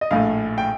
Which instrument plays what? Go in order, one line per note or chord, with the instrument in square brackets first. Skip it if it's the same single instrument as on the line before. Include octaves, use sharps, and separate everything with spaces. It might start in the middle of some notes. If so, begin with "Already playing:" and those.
[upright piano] D#5
A#1 A2 A3 F5
G5